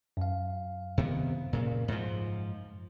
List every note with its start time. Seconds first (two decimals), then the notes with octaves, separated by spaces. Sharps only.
0.17 F#2 F5
0.98 C3 D#3 B3
1.53 A#2 C#3
1.88 G#2 F3